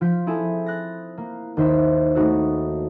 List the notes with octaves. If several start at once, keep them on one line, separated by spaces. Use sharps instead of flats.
F3 F4 C6 G6 B6
C4 E4 G#4 A4
F#6 A6 A#6
A#3
D#2 D#3 C5 E5 B6
A3 B3 D#4 F#4 A4